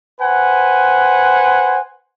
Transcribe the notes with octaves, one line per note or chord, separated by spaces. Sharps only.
B4 C5 F#5 G#5